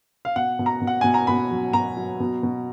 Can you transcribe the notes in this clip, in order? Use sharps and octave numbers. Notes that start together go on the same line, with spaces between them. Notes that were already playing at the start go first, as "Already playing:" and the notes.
F5
B2 F#5
B2
A#5
B2
F#5
B2 G#5
A#5
B2 B5
F#3
B2 A#5
F#3
B2
B2